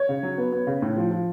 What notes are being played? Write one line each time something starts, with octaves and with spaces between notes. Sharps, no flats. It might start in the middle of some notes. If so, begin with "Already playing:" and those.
Already playing: C#5
C#3
F#3
B3
B3
C#3
A2
F3
F3